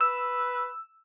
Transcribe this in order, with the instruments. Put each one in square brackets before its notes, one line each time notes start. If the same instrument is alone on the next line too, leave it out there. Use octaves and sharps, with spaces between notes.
[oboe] B4 [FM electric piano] E6